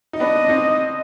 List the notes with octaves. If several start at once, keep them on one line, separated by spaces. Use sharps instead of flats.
D#4
B3 D4 D#5
D4
C4 D#4